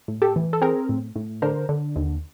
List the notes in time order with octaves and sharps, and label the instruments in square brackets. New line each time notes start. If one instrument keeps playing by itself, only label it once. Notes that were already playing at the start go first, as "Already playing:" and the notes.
[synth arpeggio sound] A2
G4 A4
E3
A4
C4 G#4 A#4
A2
A2
D3 A#4 C5
D3
D#2